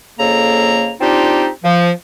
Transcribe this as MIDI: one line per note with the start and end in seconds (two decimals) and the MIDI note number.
0.19 0.92 41
0.19 0.92 49
0.19 0.92 58
0.19 0.92 69
0.19 0.92 82
1.01 1.49 60
1.01 1.49 62
1.01 1.49 63
1.01 1.49 65
1.01 1.49 67
1.64 1.90 53